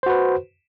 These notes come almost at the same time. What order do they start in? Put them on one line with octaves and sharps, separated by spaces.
C5 F#4 B4